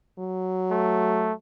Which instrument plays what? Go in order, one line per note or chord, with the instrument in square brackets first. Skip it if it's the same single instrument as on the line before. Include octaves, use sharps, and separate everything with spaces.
[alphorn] F#3
[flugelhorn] A3